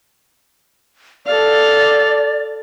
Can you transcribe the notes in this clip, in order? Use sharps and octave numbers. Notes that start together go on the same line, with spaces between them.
A4 D5 F5